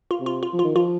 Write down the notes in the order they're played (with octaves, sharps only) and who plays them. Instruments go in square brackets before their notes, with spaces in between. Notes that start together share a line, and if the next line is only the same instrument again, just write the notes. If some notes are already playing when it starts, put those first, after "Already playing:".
[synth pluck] F4
[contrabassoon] C3
[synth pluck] F4
F4
[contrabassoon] F3
[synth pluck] F4
[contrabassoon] D#3
[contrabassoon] F3 [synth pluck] F4